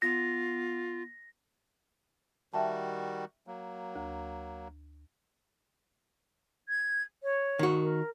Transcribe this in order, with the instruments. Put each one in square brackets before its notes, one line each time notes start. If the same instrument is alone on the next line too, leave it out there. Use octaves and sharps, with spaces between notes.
[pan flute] B3 [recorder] F4 [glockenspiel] A#6
[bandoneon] D#3 G3 F#4 [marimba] E5 G5 A5
[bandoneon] F#3 A#3
[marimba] D2
[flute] G#6
C#5
[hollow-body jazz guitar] D#3 F#4
[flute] A#4